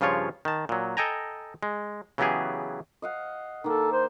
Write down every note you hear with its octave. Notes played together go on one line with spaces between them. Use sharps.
G2 C#3 F3 F4 C#5
D#3 A5
A#2 F#3
A4 D#5 G5 G#5 A#5
G#3
C#3 E3 F#3 B3 G4 G#4
D#5 F5 F#5
D#3 A#3 A4
C5